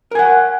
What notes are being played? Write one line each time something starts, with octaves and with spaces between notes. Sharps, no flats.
A#4 F#5 G#5